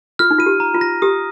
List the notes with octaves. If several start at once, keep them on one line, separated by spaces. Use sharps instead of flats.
F4 F6
D#4
F4 D#7
G4
A#5
F4
A#6
G4 D#6